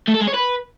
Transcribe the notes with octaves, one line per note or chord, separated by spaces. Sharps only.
A3
A4
G#3
C#5
B4